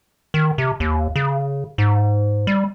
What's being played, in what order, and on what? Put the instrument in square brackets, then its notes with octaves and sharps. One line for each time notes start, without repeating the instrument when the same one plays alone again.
[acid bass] D#3
C3
D#2
C#3
G#2
G3